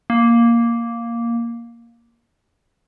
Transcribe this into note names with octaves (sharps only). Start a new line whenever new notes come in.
A#3